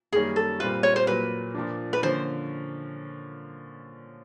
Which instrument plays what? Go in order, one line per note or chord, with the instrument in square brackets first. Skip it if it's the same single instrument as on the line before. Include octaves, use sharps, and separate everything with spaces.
[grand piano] F#2 D#3 G3 A#3 C#4 [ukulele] G#4
[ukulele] A4
[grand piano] A#2 G3 C4 F4 [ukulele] B4
[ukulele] C#5
C5
[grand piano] A#2 F#3 A#3 [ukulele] B4
[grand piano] A#2 F3 A#3 D4
[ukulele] B4
[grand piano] D3 F3 A#3 C#4 [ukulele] C5